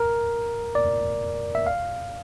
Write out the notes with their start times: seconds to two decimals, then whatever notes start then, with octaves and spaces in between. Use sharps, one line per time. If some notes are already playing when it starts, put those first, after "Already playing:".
Already playing: A#4
0.75 D5
1.55 E5
1.67 F5